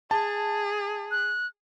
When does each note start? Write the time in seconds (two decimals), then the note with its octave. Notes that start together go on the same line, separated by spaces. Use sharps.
0.11 G#4 A5
1.11 F#6